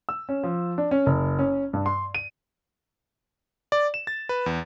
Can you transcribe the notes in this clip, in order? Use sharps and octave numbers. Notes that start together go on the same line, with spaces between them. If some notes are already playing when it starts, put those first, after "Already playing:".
E6
C#4
F3
D4
C#4
F#1
C#4
G2
C6
D#7
D5
E7
A6
B4
E2